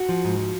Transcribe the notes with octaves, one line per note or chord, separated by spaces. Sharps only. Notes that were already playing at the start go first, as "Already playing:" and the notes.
Already playing: F#4
F3
G#2
F3